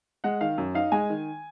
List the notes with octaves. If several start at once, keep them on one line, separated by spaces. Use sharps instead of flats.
G#3 F#5
D#3 F5
F#2
D#4 F5
G#3 G#5
D#3